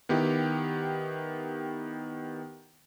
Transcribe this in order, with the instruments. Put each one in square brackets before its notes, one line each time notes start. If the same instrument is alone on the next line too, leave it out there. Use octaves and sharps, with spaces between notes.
[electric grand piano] D#3 B3 E4 G4